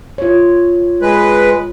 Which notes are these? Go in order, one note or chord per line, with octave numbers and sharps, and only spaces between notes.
F4 C#5
G#3 B4